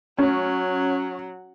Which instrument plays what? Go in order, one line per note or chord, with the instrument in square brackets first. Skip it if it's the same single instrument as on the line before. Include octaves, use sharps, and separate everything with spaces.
[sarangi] F#3 [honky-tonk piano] C#4